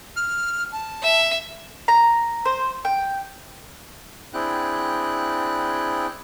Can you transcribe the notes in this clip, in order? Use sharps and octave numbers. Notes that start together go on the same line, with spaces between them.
F6
A5
E5
A#5
C5
G5
C4 D4 E4 G#4 G5 F#6